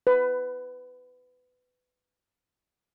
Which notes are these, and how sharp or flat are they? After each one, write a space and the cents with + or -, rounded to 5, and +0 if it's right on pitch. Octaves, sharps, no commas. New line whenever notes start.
B4 +20